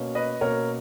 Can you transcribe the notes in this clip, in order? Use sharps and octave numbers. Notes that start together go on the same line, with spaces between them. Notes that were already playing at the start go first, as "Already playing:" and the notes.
Already playing: B2 A#3 C#4
B4 D#5
B2 A#3 C#4 A#4 C#5